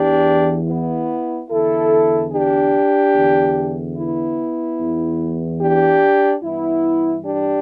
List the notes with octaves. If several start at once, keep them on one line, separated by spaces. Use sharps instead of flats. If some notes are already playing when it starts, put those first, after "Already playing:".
Already playing: E2 E3 D4 G4
B3 E4
E2 D3 E4 A4
D4 G4
E2 D3
B3 E4
E2 E3
D4 G4
G2 E3 B3 E4
D4 G4